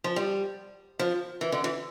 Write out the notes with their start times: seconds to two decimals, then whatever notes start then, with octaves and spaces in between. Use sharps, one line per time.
0.04 F3
0.16 G3
0.99 F3
1.41 E3
1.52 D3
1.64 E3